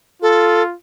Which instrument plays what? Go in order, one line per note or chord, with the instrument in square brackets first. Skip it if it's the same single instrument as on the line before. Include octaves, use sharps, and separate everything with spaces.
[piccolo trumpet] F4 [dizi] A4